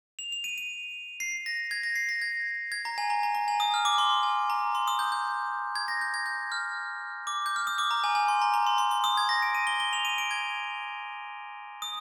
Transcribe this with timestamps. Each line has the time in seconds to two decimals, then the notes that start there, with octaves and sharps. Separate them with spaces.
0.19 F7
0.32 F7
0.44 D#7
0.58 D#7
1.20 C7
1.46 A#6
1.71 G#6
1.83 A#6
1.96 C7
2.09 A#6
2.22 G#6
2.72 G#6
2.85 A#5
2.98 G#5
3.10 A#5
3.23 A#5
3.35 A#5
3.48 G#5
3.60 D#6
3.74 F6
3.85 D6
3.98 C6
4.23 G#5
4.50 A#5
4.75 C6
4.88 D#6
4.99 G6
5.12 G6
5.75 G#6
5.88 A#6
6.01 G6
6.14 G#6
6.26 G6
6.52 F6
7.27 D6
7.46 G6
7.56 F6
7.67 D#6
7.78 D6
7.91 A#5
8.04 G#5
8.15 G#5
8.28 C6
8.42 A#5
8.54 A#5
8.67 C6
8.78 C6
8.91 C6
9.04 D#6
9.17 G#6
9.29 A#6
9.42 D7
9.55 D#7
9.67 G7
9.80 G7
9.93 F7
10.05 D#7
10.18 D7
10.31 G#6
11.82 D#6